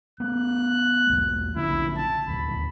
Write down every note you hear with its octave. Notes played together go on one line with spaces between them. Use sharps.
A3 B3 F#6
B1 E2
A#1 D3 C#4 E4
A5
D#1 G#1 D2 B5